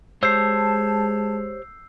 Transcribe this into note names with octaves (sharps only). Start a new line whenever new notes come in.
G#3 G4 C5 C#5 A5 E6 G6 C7